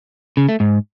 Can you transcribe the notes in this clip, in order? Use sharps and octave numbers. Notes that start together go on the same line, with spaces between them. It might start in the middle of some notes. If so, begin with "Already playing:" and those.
C#3
A3
G#2